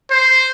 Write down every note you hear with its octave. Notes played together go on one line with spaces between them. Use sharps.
C5